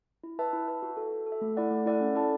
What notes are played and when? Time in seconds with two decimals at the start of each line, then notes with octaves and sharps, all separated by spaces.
0.23 E4
0.39 B4 E5 A5
0.53 E4
0.68 B4 E5 A5
0.82 F#4
0.97 A4
1.02 E5
1.12 F#4
1.27 A4
1.32 E5
1.41 A3
1.57 E4 A4 D5 F#5
1.71 A3
1.86 E4 A4 D5 F#5
2.00 C#4
2.15 E4 A4 D5 A5